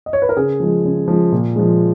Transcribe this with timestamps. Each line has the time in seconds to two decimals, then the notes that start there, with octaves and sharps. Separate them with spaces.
0.06 D#5
0.13 C#5
0.22 B4
0.29 A#4
0.37 C#3 G#4
0.60 F3 G#3
0.85 C#3
1.08 F3 G#3
1.32 A#2
1.56 F3 G#3